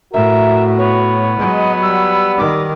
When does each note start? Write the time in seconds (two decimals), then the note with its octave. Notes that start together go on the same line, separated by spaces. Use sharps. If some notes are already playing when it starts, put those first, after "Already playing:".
0.13 A2 F#4 A#4 E5
0.78 B3 C#5
1.39 F#3 G#3 D#5
1.82 G3 E6
2.37 D#3 D6